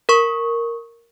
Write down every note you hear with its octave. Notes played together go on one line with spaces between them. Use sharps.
A#4 C#6